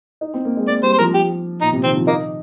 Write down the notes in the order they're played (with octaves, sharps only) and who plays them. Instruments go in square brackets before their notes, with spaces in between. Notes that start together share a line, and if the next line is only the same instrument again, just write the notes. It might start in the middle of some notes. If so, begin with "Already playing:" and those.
[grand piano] D#4
C4
A#3
G#3
[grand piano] A#3 [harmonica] D5
[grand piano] G3 [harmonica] C5
[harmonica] C5
[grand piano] F3 [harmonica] A#4
[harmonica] G4
[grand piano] A#2 [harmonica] D#4
[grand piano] C3
[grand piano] D#3 [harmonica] C4
[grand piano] F3
[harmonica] A#3 [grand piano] D#4